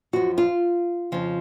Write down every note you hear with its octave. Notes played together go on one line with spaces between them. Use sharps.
F#2 F3 F#4
F4
F2 C#3 F3